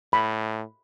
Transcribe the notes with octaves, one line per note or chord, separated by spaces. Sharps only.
A2 B5